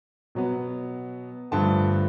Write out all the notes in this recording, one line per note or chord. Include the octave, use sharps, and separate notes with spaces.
B2 F#3 B3
G2 D3 F3 A3 A5